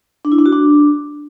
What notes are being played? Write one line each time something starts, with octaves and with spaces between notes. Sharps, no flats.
D4
E4
D4
F#4
D4